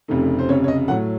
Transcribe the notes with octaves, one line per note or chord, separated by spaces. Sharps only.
F1 F2 C#3 A3 D#4
C5
F1 F2 C#3 C#5
C#5
D#5
A2 F#3 A3 F#5